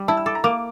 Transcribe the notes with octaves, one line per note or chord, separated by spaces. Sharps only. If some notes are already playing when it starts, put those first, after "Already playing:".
Already playing: G3
E4 A5
E6
A4 D6
A#5
A#3 D6